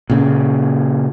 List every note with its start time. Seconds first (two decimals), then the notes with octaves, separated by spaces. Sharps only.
0.10 A#2 C#3